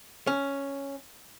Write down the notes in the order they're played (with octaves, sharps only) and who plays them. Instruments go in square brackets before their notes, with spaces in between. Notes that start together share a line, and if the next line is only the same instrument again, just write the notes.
[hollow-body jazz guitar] C#4